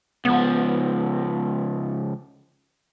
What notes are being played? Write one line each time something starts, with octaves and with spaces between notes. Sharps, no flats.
C#2 F3 B3